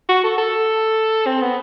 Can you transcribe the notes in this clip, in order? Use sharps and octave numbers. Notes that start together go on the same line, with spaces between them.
F#4
A4
A4
C4
B3